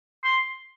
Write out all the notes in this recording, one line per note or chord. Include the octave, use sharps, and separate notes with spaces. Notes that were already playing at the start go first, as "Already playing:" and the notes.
C6